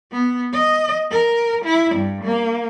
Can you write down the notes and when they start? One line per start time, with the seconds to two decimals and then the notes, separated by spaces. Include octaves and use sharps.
0.12 B3
0.53 D#5
1.11 A#4
1.65 E4
1.95 G2
2.24 A#3